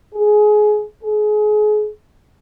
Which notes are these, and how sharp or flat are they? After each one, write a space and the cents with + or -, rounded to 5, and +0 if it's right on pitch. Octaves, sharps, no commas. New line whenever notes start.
G#4 +20
G#4 +30